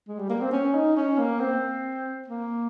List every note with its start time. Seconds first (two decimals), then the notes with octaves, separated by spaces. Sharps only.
0.09 G#3
0.19 G3
0.30 A#3
0.41 C4
0.52 C#4
0.75 D#4
0.97 C#4
1.18 A#3
1.40 C4
2.28 A#3